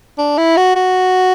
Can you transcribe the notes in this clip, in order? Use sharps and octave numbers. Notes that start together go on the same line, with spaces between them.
D4
E4
F#4
F#4